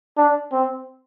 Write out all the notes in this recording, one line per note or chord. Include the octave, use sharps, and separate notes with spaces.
D4
C4